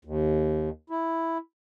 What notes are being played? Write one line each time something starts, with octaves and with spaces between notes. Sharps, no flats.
D#2
E4